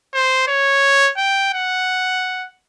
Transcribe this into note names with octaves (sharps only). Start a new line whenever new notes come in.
C5
C#5
G5
F#5